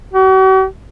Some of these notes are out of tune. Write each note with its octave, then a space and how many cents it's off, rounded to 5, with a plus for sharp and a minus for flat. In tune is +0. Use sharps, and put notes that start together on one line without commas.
F#4 +45